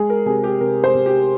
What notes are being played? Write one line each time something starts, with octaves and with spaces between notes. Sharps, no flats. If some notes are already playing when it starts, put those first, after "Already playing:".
Already playing: G#3 G#4
A#4
C3 G#4
G4
C3 A#4
C5
C3
G4